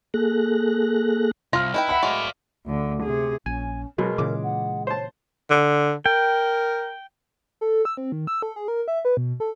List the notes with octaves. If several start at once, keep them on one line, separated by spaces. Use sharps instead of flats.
A#3 G#4 A4 F#6 A#6
C2 F4 F6 A#6
D#4 E4 B4 G5
E5 F#5 B5
F#3 G#3 A3 D5 F5
D2 D3
C3 G#4
A#1 C#4 G#5
B2 F#3 G#3 A#4
A#2 C#3 E3 D6
F#5
C5 C#5 A5
D3
A#4 G5
A4
E6
C4
D#3
E6
A4
G#4
A#4
E5
B4
B2
A4